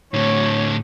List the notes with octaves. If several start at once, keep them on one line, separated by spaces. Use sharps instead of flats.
A2 D3 C#5